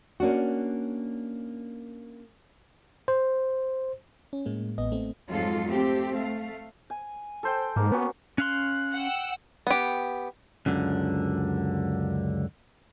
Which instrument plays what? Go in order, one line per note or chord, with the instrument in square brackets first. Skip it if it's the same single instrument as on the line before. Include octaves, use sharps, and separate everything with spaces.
[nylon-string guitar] A#3 C#4 D4 F#4
[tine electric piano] C5
[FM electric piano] C#4
A2 G#3 A#3
A1 B3 D#5
A3 C4
[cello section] F2 G#2 F#3 G#3 F4 A4
A3 C4 G4
A3 F5
[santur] G#5
A4 C5 G5
[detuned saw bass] G#2 [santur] A#3
[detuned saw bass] B3 [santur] C#4 F#4
[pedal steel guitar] C#4 F5 C6 [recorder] F#6
[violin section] F#5 G5 E6
[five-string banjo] B3 G4
[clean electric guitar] C#2 F#2 D3